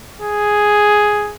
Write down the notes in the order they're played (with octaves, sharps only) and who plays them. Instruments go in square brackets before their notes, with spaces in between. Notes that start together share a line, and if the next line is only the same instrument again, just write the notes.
[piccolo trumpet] G#4